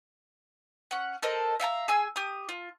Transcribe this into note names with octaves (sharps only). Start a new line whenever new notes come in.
C#4 F#5
A4 A#4 C5 D#5
E5 F5 G5 A#5
G#4 G#5 E6
G4 D#6
F4